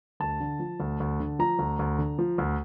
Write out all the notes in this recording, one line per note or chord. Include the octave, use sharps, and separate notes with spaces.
D2 A5
D3
F3
D2
D2
D3
F3 A#5
D2
D2
D3
F3
D2